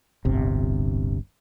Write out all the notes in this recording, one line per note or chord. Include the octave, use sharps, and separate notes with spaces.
D1 G1 C3